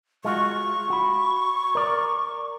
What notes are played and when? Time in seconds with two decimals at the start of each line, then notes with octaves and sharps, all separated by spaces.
0.25 G#3 F4 F#4 C#6
0.90 F#4 B5
1.75 A#4 D5